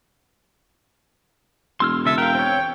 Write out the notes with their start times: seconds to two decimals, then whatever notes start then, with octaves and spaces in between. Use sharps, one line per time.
1.80 E1 C6 E6 F6
2.06 C#3 A4 E5
2.18 A#4 F5 G5
2.35 C4 C#5